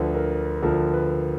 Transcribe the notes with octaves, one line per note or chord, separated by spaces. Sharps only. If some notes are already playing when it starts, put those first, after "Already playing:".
Already playing: D2 D3 F3 B4
A#4
D2 D3 F3 A#4
B4